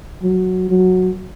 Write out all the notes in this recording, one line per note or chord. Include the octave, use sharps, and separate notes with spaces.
F#3
F#3